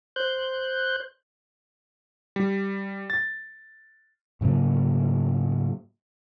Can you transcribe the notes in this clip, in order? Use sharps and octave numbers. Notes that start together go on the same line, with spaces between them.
C5 F#6 G6
G3
A6
G#2 C#3 F#3 A#3